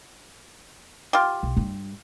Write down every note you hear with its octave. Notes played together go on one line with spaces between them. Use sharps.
F4 G4
B1
G2 G3